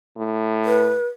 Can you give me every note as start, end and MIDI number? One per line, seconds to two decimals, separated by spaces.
0.17 0.95 45
0.65 1.06 71